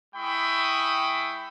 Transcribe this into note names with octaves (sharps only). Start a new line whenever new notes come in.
G#3 E4 G5 B5 C#6 D#6